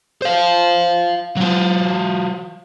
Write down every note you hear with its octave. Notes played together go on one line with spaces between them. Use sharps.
C5 F5
F#3 F4